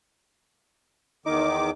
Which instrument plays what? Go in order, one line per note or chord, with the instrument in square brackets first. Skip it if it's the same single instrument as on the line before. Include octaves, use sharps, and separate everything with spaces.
[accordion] E2 D#3 D6 [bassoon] D#4